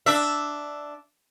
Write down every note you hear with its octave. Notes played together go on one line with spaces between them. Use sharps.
D4 E5